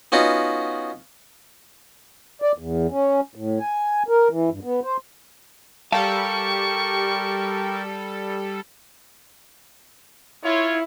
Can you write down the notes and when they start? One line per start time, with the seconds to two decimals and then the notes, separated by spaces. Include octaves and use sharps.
0.12 B3 C#4 D#4 F4 F#4 B4
2.42 D5
2.58 E2
2.90 C#4
3.35 A2
3.60 G#5
4.08 A#4
4.30 E3
4.50 G2
4.64 B3
4.84 C5
5.92 G3 G4 A4 A#4 F5 A5 C#6
10.44 E4 F4 C#5